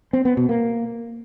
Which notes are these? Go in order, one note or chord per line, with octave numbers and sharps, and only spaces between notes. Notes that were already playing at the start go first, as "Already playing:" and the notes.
C4
B3
B2
A#3